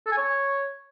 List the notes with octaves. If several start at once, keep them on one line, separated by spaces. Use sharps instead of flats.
A4
G#5
C#5